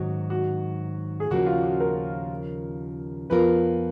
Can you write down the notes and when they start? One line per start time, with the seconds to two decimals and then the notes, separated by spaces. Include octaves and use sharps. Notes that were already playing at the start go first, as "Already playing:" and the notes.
Already playing: G#2 D#3 F#3 F#4
0.30 F#4
1.20 G#4
1.30 D#2 C#3 F3 A#3 F#4
1.46 F4
1.63 F#4
1.80 A#4
3.30 F2 F3 B3 F4 A#4 B4